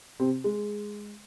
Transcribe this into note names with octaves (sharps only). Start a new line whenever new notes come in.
C3 C4
G#3